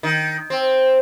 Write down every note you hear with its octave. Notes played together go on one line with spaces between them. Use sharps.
D#3
C4